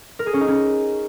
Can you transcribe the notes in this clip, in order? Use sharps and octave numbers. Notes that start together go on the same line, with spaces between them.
A#4
G#4
C#4
D#4
C#4